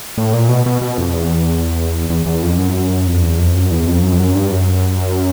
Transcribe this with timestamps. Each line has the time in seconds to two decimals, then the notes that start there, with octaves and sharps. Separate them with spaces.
0.18 A2
0.33 A#2
0.49 B2
0.66 B2
0.82 B2
0.98 F2
1.13 E2
2.10 E2
2.26 E2
2.43 F2
2.58 F#2
3.07 F2
3.22 E2
3.39 F2
3.56 F#2
3.71 E2
3.87 F2
4.03 F#2
4.13 F2
4.19 F#2
4.35 G2
4.51 F#2